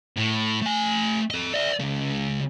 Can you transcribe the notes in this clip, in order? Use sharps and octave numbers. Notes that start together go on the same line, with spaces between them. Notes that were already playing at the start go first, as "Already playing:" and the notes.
A2
A3 G#5
A4 D#5
D5 E5
C#2 C#3